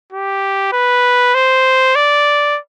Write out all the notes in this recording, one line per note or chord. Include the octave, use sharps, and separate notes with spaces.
G4
B4
C5
D5